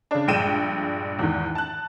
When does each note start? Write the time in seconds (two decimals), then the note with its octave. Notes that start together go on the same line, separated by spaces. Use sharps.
0.11 C#3 D4
0.28 A#1 G2 G#3 G5 D#7 E7
1.19 E2 G#2 D#3
1.55 A5 F#6